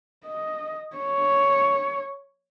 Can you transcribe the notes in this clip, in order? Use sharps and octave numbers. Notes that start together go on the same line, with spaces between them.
D#5
C#5